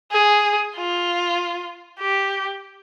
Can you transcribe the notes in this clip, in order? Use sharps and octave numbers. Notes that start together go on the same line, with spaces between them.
G#4
F4
G4